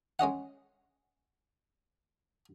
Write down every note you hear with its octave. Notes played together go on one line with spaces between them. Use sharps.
G#3 C#4 D#5 F#5